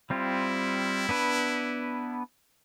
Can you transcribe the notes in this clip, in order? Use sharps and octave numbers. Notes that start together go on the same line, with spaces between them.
G3 C4 E4 F4
B3 D4 B4